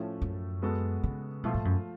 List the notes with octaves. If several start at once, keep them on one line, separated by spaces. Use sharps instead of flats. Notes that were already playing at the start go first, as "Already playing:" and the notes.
Already playing: A2 F3 A3 C#4
F#2
G#3 B3 F#4 A4
C#3
B2 F3 A3 F4
G#2
F#2